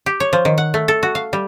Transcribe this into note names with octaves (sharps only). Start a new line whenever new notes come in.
G4
C#5
F3
D#3
F#5
A3
A4
F#4
F5
G3